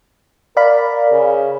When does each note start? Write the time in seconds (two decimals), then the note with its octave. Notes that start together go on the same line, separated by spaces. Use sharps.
0.57 A#4 D5 F5 B5
1.11 C#3